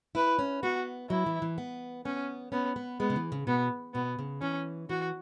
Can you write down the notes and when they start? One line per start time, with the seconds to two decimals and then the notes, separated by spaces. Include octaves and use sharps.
0.15 E4 B4
0.39 C#4
0.63 B3 F#4
1.10 F#3 E4
1.26 E3
1.42 E3
1.58 B3
2.05 B3 C#4
2.52 B3 C#4
2.76 B3
3.00 G#3 B3
3.10 C#3
3.16 E3
3.32 C#3
3.47 B2 B3
3.94 B2 B3
4.19 C#3
4.42 E3 C#4
4.89 E3 F#4